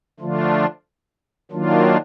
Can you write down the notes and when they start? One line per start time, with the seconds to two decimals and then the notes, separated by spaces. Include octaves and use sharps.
0.19 D3 F3 A3 D4 F4
1.51 D#3 F#3 A#3 D4 F4